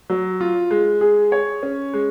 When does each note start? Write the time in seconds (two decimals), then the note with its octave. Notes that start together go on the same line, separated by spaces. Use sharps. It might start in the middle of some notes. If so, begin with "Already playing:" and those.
0.10 F#3
0.41 F4
0.71 G#3
1.01 G#4
1.32 C#5
1.63 C#4
1.93 G#3